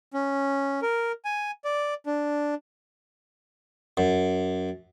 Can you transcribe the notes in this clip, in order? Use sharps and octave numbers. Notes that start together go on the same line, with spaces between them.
C#4
A#4
G#5
D5
D4
F#2